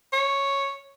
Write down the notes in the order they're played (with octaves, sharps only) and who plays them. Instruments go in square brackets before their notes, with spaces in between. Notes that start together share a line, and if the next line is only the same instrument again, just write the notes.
[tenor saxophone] C#5